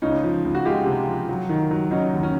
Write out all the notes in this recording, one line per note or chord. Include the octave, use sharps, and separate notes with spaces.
C#2 C#4 D#4
F3
C#2
F#4
G#3 F4 G4
C3
F3
F#3
D#3
F#3
F#3 C#4 D#4
D#2
C#4